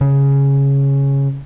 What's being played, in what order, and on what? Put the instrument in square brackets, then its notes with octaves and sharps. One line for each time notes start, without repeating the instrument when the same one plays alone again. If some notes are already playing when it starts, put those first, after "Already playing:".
[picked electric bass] C#3